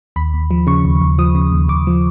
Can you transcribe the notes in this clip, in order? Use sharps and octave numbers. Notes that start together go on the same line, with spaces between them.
D#2 B5
D#2
F3
C#3 C#6
D#2
D#2
F3 D#6
C#3
D#2
D#2 D6
F3